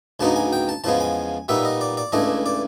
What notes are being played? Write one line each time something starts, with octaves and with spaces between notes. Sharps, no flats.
D2 C#3 F#3 B3 D#4 A5
G#5
G5
A5
E2 C#3 F3 G#3 B3 A5
G#5
A#2 G3 B3 D#4 E5
D#5
D5
D5
C#2 C#3 E3 A3 D4 D#5
D5